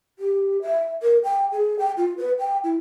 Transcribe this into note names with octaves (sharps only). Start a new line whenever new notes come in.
G4
E5
A#4
G5
G#4
G5
F4
B4
G5
E4